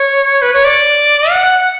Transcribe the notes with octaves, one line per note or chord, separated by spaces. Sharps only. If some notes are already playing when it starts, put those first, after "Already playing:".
Already playing: C#5
B4
C#5
D5
F#5